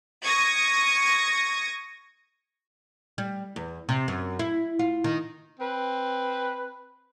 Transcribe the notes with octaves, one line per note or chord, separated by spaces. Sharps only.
C#6 D#6 G#6 A#6
G3
E2
C3
F#2
E4
F4
D#3
C4 B4